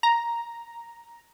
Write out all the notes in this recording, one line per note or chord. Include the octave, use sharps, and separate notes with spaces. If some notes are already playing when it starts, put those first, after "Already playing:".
A#5